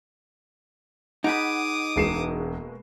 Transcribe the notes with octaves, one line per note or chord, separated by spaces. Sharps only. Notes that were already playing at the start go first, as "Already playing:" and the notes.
D#4 G#4 B4 F#5 D6 D#6
E1 B2 G#3 A#3 C7 E7